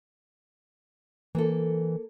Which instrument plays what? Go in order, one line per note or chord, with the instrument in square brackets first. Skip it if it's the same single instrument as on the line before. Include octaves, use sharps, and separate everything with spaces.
[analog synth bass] E3 [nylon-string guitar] A#3 A4